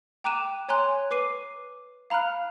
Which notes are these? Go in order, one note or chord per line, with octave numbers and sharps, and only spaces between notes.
G5 A#5 D6 F#6 D#7 E7
C#5 G#5 A#5 C6 F#6
B4 D6 C7 D#7
F5 A#5 B5 F6 F#6